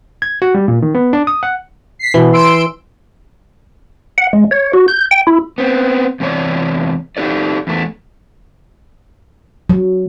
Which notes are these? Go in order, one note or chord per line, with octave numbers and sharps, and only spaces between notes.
G#6
F#4
G3
A#2
D#3
B3
D4
D#6
F#5
B6 C7
B2 E3
C6 E6 D7
F#5
G#3
C#5
F#4
G6
G5
E4
B3 C4
E2 C3 G#3 A3 C#5 D5
D#4 G4 A4 D5
E2 A3
F#3